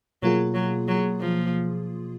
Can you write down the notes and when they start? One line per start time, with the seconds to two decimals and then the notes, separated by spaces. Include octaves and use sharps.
0.23 B2 F#3 A#3 F4 G#4
0.54 F#3
0.88 F#3
1.21 F3